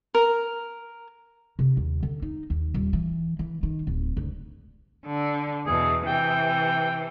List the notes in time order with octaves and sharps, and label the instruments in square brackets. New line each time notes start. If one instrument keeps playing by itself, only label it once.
[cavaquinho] A#4
[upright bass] C3
D#2
D3
D#4
D#2
D#1
E3
E3
D#3
D1
D2
[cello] D3
[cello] E2 B2 [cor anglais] G#4
[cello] C3 E3 [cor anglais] G5